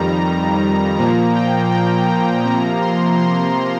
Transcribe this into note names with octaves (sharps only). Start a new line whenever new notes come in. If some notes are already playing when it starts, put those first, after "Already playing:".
Already playing: F2 D#3 G3 A#5
A#2 F3 A#3 A#5
G5
G5
A#5
C3 F3 A#3 A#5
C6
C6